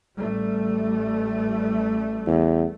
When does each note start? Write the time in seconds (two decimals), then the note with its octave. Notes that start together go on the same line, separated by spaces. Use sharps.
0.18 A1 G3 A3
2.27 E2